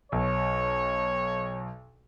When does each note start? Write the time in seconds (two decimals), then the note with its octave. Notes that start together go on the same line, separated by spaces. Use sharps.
0.12 B1 C#5